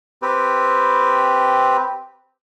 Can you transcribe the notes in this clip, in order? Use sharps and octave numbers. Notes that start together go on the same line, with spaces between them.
C4 G4 B4